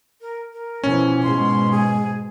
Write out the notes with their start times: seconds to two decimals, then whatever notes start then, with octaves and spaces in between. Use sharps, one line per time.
0.21 A#4
0.53 A#4
0.84 B2 E3 F3 C#4
1.23 G#2 B2 G#3 C6
1.72 G#4